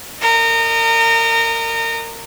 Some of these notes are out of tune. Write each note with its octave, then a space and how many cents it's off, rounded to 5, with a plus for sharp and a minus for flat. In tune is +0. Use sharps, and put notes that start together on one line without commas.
A#4 -25 D#5 -30